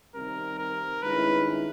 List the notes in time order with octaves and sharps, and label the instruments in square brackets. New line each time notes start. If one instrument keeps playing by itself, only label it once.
[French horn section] C3 D#3 G3 C4 [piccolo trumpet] A#4
[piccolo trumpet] A#4
[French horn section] G2 D#3 G#3 C#4 E4 [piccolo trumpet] B4